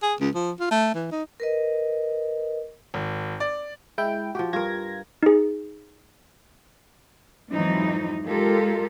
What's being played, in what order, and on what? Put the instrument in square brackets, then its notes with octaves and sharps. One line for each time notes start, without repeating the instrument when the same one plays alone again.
[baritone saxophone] G#4
C#2
F3
F4
A3
E3
D#4
[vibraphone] A#4 B4 D#5
[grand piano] G#1
D5
[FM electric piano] G#3 E4 G5
[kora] F3 G4 [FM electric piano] F#4 G5
[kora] G2 A#4 [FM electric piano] F4 G#6 A#6
[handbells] D#4 G#4
[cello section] F2 G#2 E3 F#3 D#4
G#3 F4 G4 A4 A#4